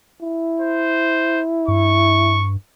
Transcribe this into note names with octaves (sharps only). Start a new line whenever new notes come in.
E4
C5
G2 C#6